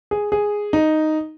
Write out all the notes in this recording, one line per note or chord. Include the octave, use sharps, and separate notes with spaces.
G#4
G#4
D#4